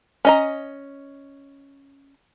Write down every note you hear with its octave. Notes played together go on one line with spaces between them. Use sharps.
C#4 D#5 A#5